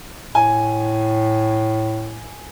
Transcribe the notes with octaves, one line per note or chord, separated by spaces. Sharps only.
A2 G#5